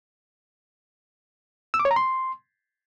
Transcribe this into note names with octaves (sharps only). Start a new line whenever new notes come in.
E6
D6
C#5
A#5
C6